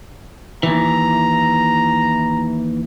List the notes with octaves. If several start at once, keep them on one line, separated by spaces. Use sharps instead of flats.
D#2 E3 A#5